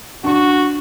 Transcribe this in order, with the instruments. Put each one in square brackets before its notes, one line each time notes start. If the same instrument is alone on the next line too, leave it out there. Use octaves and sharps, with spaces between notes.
[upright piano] D4 C#6 [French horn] F#4